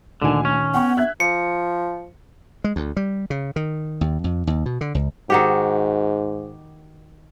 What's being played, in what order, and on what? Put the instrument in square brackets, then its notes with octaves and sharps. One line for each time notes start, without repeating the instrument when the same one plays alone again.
[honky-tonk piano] D2 G#5 [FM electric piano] A#2 D#3 [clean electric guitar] D3
[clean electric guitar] C#4
[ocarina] B3 [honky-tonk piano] F#5 G5 C#6
[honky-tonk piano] E5 F#6 G#6
[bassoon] F3 [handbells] C#7
[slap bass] G#3
D2
G3
C#3
D#3
D#2
F2
D#2
B2
D3
C#2
[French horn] G#2 [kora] D#3 F#4 G4